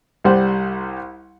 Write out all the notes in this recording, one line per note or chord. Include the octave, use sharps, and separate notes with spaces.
C2 G3 C5 F#5